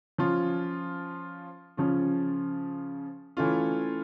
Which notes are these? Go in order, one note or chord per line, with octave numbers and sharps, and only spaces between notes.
F3 C#4 F4
C#3 F3 C#4 F4
E3 A3 C#4 F4